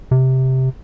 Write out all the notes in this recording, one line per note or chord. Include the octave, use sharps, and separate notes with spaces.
C3